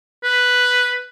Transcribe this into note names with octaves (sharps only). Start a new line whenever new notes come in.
B4